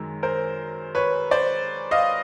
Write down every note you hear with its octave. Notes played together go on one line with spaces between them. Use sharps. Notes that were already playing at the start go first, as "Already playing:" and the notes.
Already playing: F#2 D#3 G#3
A#4 C5
B4 C#5
C5 D5
D#5 F5